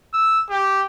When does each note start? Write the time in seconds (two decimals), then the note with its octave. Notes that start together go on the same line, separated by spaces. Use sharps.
0.14 E6
0.50 G4